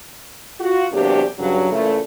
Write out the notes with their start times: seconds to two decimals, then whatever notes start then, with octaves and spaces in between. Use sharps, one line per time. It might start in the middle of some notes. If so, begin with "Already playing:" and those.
0.59 F4 F#4
0.92 E2 C3 F#3 A#3 D4 G4
1.38 G2 C#3 F#3
1.72 A#2 C#3 E3 A3